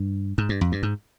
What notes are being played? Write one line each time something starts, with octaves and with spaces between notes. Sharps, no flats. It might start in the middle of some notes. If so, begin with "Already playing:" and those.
Already playing: G2
G#2
G2
F2
G2
G#2